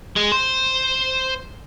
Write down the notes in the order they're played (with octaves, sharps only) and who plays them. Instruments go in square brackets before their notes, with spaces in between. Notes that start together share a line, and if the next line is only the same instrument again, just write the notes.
[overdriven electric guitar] G#3
C5